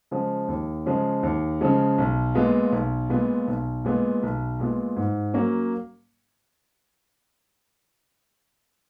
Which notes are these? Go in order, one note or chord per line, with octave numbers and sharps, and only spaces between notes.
C#3 F3 G#3
D#2
C#3 F3 G#3
D#2
C#3 F3 G#3
B1
A#2 G#3 B3 F4
B1
A#2 G#3 B3 F4
B1
A#2 G#3 B3 F4
B1
A#2 G#3 B3 F4
G#2
F#3 A#3 C#4